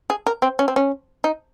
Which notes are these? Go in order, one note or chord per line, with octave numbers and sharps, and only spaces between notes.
G#4
A#4
C4
C#4
C4
C#4
D#4